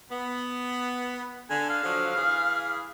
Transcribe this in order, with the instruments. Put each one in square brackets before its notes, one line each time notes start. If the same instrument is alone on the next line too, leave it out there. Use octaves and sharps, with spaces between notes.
[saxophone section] B3
[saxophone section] D3 [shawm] G#5
[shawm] F5
[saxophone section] D3 F3 F#3
E3 G#4